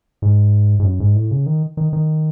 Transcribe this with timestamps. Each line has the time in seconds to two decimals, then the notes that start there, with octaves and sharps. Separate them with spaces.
0.22 G#2
0.80 G#2
0.84 F#2
1.00 G#2
1.16 A2
1.31 C#3
1.46 D#3
1.77 D#3
1.93 D#3